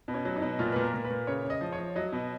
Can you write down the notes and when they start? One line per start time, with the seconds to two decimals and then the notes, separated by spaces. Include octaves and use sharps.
0.08 B2
0.14 C#4
0.25 F#3
0.36 D#4
0.42 B2
0.59 A#2 F4
0.72 A#2 B4
0.82 A#4
0.93 A#2
1.05 B4
1.10 A#2
1.27 C#3 C#5
1.44 C#3
1.50 D#5
1.61 F3
1.72 C#5
1.78 F3
1.96 F#3 D#5
2.12 B2